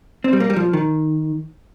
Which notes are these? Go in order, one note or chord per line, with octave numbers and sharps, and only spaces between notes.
C4
G3
A#3
G3
F3
D#3